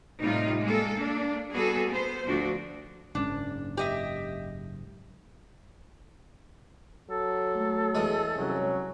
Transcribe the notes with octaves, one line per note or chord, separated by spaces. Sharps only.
A2 C3 G3 D#4 F4
G#3 A#3 A4
A#3 D4
G3 B3 F#4 G#4 A4
B3 C5
D2 F3 D4 F#4
F#1 G#2 C#4 D4
G4 D#5 E5
F#3 A4
A3
E2 G#3
C2 F#3 C#4